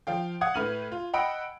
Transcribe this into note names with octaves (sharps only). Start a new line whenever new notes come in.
F3 F5 G5
F5 F#5 D#6 G#6
A2 B4 F6 D#7 F#7
F4
D#5 F#5 G5 B5 E6 D7